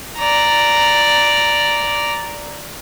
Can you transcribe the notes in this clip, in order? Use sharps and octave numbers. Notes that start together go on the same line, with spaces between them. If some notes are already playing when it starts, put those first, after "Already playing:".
D5 A#5